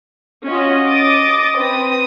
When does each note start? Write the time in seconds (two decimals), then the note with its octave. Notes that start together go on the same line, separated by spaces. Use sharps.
0.47 C#4 F4 F#4 D#5
0.88 D6 D#6 A6
1.57 C4 B4 D#6